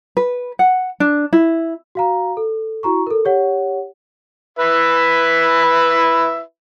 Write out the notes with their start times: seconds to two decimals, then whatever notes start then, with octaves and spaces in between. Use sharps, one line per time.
0.17 B4
0.59 F#5
1.00 D4
1.33 E4
1.95 F#4 F5 A#5
2.37 A4
2.83 E4 F#4 A#5 C#6
3.07 A4 A#4
3.25 G4 C#5 F#5
4.59 E4 B4 E5